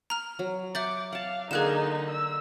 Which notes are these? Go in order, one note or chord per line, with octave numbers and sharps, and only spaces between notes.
A#5 F6
F#3
E5 F#5 D6 G6 A6
F5 F#5 A5
D3 A#3 D#4 G#4 G#5 F#6 E7
E6